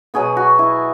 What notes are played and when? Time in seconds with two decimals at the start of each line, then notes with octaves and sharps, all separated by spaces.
0.14 B2 F#3 B3 G#4
0.37 F#4
0.59 E4